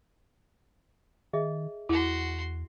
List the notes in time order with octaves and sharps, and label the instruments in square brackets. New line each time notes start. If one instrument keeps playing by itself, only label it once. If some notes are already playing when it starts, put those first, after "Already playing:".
[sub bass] D#3 [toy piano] G#4 D#5 E5
[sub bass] E2 [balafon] E4 [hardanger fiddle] F#4 C6